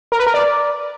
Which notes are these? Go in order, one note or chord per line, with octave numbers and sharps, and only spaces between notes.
A#4
B4
A#4
D5